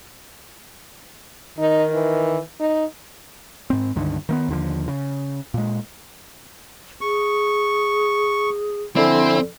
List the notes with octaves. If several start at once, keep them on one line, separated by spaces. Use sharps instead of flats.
D#3 D#4
E3
D#4
G#2 C4
C#2 G2 D3 D#3
D#3 A3 B3
D#2 D3 F3
C#3
A#2 G#3
G#4 C#6
D3 F3 C4 E4 A4 D5 G#5